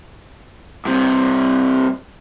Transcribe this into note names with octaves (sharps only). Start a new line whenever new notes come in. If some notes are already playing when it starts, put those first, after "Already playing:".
G2 C3